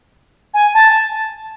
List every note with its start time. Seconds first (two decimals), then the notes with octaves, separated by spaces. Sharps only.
0.54 G#5
0.74 A5